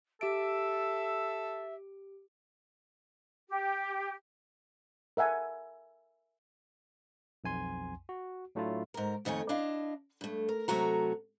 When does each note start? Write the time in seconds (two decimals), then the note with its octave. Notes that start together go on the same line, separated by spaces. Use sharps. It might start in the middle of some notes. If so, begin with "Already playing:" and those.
0.21 G4 A4 E5 D7
3.48 G4
5.17 A#4 E5 F#5 G#5
7.44 B1 F2 G#5 C6
8.09 F#4
8.55 A2 F#3 A3 D4 E4 F4
8.94 G#2 A#4
9.25 F2 D#3 A3 C#5 G#5
9.49 D4 E4 D#5 F5
10.21 G2 A3
10.49 A#4
10.68 C3 F#3 A3 F#4 A#5